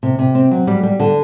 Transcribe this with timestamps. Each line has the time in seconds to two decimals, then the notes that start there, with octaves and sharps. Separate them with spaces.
0.03 C3
0.19 C3
0.35 C4
0.51 F#3
0.67 G3
0.83 G3
1.00 D3